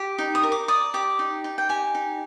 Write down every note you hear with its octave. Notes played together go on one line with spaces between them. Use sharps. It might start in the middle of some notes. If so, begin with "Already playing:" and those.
Already playing: G4
D#4
D#6
A#4
D6
D5 D#6
G4 D6
D#4
D#4
G5
G4 G#5
D#4